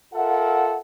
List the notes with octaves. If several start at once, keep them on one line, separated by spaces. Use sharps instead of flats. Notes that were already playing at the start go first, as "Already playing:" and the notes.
F4 A4 A#4 E5 F#5